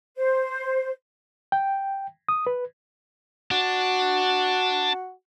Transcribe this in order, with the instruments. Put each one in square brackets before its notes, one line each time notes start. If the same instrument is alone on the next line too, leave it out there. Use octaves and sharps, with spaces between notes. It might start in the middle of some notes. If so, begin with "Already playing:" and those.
[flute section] C5
[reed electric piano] G5
D#6
B4
[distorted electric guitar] D4 [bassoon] F#4